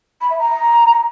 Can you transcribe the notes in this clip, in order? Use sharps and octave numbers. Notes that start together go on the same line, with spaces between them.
B5
E5
A#5